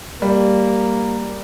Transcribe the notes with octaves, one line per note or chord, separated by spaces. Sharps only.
G3 A#3